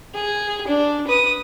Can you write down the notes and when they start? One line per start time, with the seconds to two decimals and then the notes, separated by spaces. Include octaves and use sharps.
0.15 G#4
0.67 D4
1.07 B4 D#6